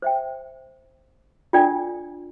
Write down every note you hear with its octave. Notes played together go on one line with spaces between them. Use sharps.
C5 E5 G5
D4 F4 A4 D5 G5